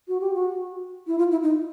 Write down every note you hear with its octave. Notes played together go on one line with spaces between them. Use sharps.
F#4
G4
F#4
E4
F4
E4
D#4